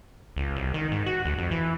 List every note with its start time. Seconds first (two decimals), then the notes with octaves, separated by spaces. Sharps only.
0.37 C#2
0.56 C2
0.74 D#3
0.92 G#2
1.06 F#4
1.25 D2
1.38 F2
1.51 E3